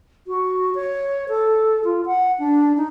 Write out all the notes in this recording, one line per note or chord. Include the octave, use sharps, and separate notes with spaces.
F#4
C#5
A4
F4
F#5
D4
D#4